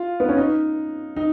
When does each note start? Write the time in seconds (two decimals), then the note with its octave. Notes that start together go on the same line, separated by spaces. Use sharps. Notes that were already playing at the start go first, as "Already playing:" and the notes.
Already playing: F4
0.20 B3
0.29 C#4
0.37 D#4
1.16 D#4